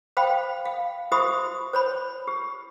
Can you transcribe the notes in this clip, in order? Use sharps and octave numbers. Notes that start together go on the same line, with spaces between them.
C5 F5 G5 B5
F5
F#4 G4 C5 E5 B5 D#6
C5 C#5 B5
G4